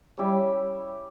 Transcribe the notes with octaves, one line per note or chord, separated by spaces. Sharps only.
G3 C#4 E4 G4